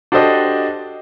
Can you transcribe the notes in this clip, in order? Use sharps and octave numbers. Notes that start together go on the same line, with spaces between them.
D4 F#4 G4 A4 C5 D#5